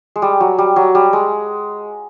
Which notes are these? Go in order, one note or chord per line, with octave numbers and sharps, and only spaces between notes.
G#3
G3
F#3
G3
F#3
G3
G#3